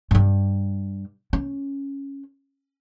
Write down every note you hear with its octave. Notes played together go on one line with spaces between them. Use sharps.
G2 G3
C#4